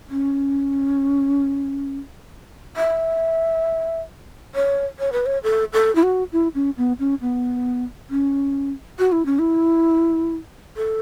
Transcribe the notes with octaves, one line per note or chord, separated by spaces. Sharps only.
C#4
E5
C#5
C#5
B4
C#5
A4
A4
E4
F#4
E4
C#4
B3
C#4
B3
C#4
F#4
E4
C#4
E4
A4